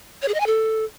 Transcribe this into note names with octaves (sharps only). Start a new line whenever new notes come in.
C#5
G#4
D#5
G#5
A4